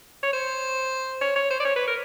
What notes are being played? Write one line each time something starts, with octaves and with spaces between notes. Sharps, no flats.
C#5
C5
C#5
C#5
C5
D5
C#5
B4
A#4